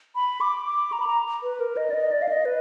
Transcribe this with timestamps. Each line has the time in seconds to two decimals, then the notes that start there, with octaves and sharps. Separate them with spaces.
0.15 B5
0.41 D6
0.66 D6
0.92 A#5
1.00 B5
1.07 A#5
1.43 B4
1.60 A#4
1.77 D#5
1.90 D5
1.94 D#5
2.12 D5
2.22 F5
2.29 D#5
2.45 B4